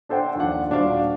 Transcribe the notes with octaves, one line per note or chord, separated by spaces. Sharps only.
D4 A4 C5 F#5 G5
D#2 F3 D4 F#5
D#1 D4 F#4 C5 F5 D6